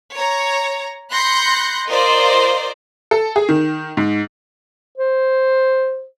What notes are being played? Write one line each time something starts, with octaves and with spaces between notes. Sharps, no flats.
C#5 A#5
B5 C6 F#6 G6 A#6 C#7
F4 A#4 C5 D5 D#5
A4
G#4
D#3
G#2
C5